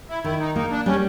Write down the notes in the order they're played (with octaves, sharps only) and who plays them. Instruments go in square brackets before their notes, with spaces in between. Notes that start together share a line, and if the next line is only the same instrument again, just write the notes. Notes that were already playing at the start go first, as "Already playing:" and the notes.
[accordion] E4
[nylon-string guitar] D#3 [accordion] E4
[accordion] D#4
[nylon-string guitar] A#3 [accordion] D#4
[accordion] D4
[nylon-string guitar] G3 [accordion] C#4